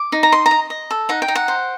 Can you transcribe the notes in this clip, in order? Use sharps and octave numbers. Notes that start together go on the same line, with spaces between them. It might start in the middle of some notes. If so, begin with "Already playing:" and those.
Already playing: D6
D#4
A#5
D#5 C6
A#5
D#5
D#5
A4
D#4 F#5
G5
D#4
F#5
C5